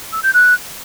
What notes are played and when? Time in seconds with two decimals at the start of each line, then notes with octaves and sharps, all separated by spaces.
0.12 E6
0.23 G6
0.34 F#6